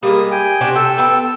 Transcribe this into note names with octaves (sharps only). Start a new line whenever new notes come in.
G3 G#3 A#3 D#6
G5 G#5
C3 D4 F#4
A4 G5 E6
B3 G5